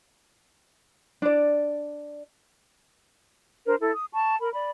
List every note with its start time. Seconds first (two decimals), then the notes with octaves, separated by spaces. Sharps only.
1.22 D4 D5
3.65 D4 A#4 C5
3.79 E4 A4
3.93 D#6
4.14 A5 C#6
4.41 A#4 B5
4.54 D5 B5